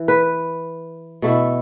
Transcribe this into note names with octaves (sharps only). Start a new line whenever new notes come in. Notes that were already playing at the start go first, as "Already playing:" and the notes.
Already playing: E3
B4
B2 A3 E4